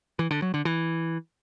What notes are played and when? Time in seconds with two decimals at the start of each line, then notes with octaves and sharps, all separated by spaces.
0.19 E3
0.31 D3
0.42 F#3
0.54 D3
0.65 E3